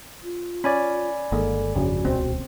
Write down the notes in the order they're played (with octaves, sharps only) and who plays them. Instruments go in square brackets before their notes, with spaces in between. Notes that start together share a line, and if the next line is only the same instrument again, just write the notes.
[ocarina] F4
[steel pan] C#4 [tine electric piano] D5 G#5 B5
[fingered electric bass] G1 [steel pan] D#3 G#3 A#3 [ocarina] A4
[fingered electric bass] G1 F2 [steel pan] C#3 [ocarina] F#4
[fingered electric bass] D#1 C#2 B2 [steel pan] C4